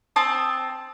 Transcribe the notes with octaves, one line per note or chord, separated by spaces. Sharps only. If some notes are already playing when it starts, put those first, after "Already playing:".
C4 A5 D#6